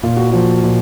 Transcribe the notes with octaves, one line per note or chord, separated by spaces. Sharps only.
A#2 F4
F#4
F3 F4
A#2